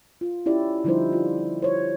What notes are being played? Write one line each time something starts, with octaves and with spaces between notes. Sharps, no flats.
F4
C#4 E4 G4 D5
D3 F3 G3 D#4 E4 C5
F4
C5 C#5